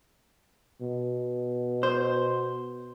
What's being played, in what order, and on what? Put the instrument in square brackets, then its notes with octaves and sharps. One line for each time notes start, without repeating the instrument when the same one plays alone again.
[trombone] B2
[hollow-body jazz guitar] C5